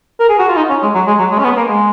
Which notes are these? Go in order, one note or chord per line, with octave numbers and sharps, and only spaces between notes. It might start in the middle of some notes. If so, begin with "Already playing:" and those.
A#4
G#4
F#4
F4
D#4
C#4
G#3
F#3
G#3
F#3
G#3
C#4
B3
A#3
G#3